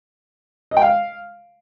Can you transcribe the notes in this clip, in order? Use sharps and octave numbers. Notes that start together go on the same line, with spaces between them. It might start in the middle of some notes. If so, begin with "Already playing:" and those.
D#5
G5
F5